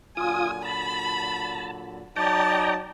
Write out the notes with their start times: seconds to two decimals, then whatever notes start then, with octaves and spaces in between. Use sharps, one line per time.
0.17 A#2 D3 F#3 F4 G#5 D#6
0.64 A5 B5
2.16 F#3 D#4 D5 G5 A5 A#5